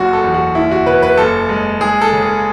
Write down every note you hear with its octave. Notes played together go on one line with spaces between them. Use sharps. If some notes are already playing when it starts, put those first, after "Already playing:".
Already playing: F#1 F#2 F#4
A4
E2
F#4
F#1 E4
F#4
C#3 B4
B4
F#1 A4
G#3
G#3 G#4
A4
C#3
G#4